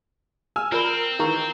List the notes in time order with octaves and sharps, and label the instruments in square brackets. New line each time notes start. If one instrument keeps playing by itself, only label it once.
[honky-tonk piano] G#5 E6 F6
[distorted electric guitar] C4 [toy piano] F4 D5 B5 [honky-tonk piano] A#4
[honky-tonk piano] D#3 E3 [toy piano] F5 A#5 C#6